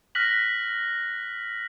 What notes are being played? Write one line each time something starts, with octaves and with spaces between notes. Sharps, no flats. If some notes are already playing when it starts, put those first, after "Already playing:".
F6 F#6 A#6 B6 F#7